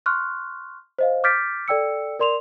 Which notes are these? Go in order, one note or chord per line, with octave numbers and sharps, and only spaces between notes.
C6 C#6 F6 F#6
C5 D#5 F5
D6 F6 G6 A6 B6 D7
A4 D5 G5 E6 C#7
A#4 D5 C6 E7 F7